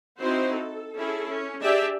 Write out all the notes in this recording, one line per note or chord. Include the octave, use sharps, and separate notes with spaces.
C4 D#4 E4 F#4 C5
A4
C#4 E4 G#4 A4
C#4
D4 G4 G#4 D5 E5